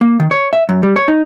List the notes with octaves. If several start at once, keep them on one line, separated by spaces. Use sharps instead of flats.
A#3
D#3
C#5
E5
F#2
G3
C#5
D#4